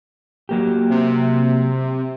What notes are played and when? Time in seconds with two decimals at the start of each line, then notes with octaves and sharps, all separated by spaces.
0.49 F#3 A#3 G4
0.90 C3